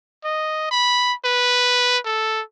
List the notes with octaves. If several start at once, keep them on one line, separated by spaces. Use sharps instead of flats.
D#5
B5
B4
A4